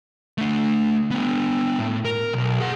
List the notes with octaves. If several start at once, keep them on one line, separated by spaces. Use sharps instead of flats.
A3 D4
B3 D4
A2
A#4
B1
G#4 F#5